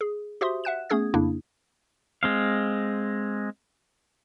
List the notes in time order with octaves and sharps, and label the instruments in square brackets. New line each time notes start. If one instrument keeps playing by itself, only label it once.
[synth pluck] G#4
F#4 G4 C5 E5 C6 D#6
E5 F#5 F#6 E7
A3 B3 C#4 G#4 D#6 G#6
F2 C#3 A#3 D4 E4
[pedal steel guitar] G#3 C4 F5